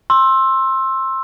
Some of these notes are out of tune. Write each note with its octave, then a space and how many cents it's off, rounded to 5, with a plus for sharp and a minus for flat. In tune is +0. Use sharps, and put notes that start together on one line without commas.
C6 +20 E6 +0